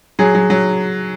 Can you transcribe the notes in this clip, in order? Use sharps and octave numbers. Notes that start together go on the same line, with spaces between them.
F#3 G#4
F#3
F#3